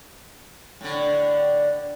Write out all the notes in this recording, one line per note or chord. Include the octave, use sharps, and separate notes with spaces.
A2 D3